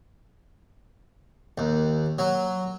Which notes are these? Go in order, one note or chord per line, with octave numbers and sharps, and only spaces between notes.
D#2
F#3